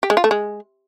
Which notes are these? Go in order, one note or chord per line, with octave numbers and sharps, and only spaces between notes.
G4
G#3
F4
A3
G#3